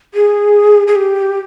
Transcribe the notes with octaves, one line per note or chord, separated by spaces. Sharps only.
G#4
G#4
G4